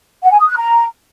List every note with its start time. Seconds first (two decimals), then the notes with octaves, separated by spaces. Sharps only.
0.23 F#5
0.31 G#5
0.40 D#6
0.48 F#6
0.57 A#5